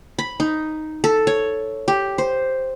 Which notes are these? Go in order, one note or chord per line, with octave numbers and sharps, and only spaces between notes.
B5
D#4
A4
C#5
G4
C5